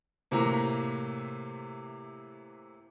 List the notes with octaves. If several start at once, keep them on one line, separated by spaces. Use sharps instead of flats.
A2 C3 E3 A#3 A#5